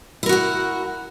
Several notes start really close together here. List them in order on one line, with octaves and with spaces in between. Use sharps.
E4 A#4 F#4 F#5